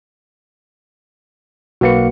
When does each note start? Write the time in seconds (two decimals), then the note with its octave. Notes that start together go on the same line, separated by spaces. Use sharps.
1.81 B1 A#3 F#4 B4 C#7